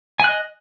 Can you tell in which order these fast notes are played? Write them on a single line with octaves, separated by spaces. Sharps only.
G#5 F#6 D#5